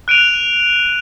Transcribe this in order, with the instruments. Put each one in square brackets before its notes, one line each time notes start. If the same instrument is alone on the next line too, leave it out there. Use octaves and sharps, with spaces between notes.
[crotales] F#6 D7 D#7 F7